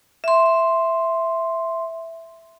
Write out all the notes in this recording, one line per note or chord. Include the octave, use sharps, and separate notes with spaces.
E5 C6